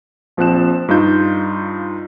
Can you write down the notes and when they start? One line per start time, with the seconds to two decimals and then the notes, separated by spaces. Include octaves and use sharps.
0.37 A#1 F3 C4 F#6 E7
0.88 G2 D#4 F4 G6